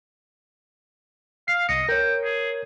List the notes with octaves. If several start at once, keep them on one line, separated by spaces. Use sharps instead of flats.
F5 C7
C2 D#5 C#7
A#4 C#5 G5
G#4